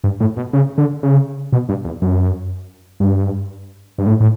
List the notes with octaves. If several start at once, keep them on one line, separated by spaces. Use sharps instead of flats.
G2
A2
B2
C#3
D3
C#3
B2
G2
E2
F#2
G2
G2
A2
A2